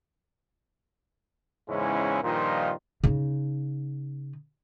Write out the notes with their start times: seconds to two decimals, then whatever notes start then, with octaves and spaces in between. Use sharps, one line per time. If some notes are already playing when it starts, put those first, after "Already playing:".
1.69 E2 G#2 C#3 G#3 C#4 E4
2.24 G2 A#2 D#3 F3 D#4 F4
3.04 C#3 D#4